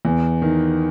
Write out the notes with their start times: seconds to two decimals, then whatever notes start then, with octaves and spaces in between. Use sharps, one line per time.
0.05 E2
0.42 D#3